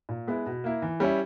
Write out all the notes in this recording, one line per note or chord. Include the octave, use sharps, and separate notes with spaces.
A#2
G#3 B3 E4
B2
A#3 E4
E3
G3 C#4 E4